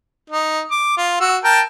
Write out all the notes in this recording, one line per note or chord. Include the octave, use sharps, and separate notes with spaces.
D#4
D6
F4
F#4 E6
A#4 G5 A5